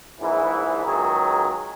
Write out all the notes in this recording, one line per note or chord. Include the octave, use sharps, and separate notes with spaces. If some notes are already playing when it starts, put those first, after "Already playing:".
A#1 G#2 E3
C#2 D#3 F#3 G#4